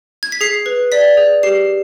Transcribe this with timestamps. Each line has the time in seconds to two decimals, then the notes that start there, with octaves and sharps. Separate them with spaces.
0.23 G#6
0.32 B6
0.41 G#4 C7
0.66 B4
0.92 D5 B6
1.17 G#4
1.43 G4 C7